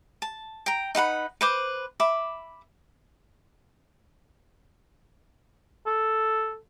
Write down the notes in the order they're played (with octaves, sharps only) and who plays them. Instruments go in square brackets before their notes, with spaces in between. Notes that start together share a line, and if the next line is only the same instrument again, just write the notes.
[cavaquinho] A5
G5 A#5
D#4 B4 F#5 B5
B4 C5 D6
E5 B5 D6
[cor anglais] A4